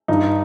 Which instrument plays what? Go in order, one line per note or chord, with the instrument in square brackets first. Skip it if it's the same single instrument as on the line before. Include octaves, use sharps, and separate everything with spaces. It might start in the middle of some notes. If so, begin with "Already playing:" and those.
[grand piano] G2 D#4